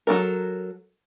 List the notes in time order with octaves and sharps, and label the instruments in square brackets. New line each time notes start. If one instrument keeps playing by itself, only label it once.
[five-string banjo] F#3 B3 A4 A#4